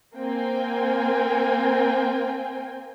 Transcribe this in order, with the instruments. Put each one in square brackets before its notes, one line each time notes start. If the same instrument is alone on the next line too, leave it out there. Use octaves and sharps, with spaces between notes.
[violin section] A#3 C4 G5 G#5